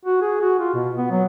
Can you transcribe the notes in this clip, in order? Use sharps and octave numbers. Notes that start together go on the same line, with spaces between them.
F#4
G#4
F#4
F4
B2
B3
F#3